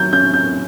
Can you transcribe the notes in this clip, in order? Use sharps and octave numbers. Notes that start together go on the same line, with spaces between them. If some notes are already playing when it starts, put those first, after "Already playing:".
Already playing: F#3 G6
C#4 G6
G6